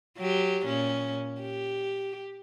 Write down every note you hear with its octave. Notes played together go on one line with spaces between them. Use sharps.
F#3 G4
A#2 C#4
G4